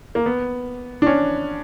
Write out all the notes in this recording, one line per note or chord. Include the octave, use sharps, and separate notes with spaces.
A#3
B3
D4
C#4